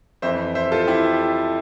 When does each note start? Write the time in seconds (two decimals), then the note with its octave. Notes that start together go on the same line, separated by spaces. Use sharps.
0.22 F2 E3 C5 E5
0.55 C5 E5
0.72 F4 A4
0.88 E4 G4